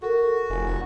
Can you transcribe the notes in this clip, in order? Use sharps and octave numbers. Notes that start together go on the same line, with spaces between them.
F#4 A4 A#4
F1 G#5